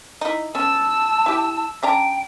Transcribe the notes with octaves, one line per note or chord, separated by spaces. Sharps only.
D#4 E4
B3 C#4 A5 E6
E4 G4
C#3 D4 G5 A#5